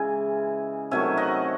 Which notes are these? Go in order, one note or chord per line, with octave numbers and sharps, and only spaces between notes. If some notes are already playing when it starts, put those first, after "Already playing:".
Already playing: C#3 E3 G#3 E5 G#5
C3 D#3 F#3 A3 E5 G#5
D#5 F#5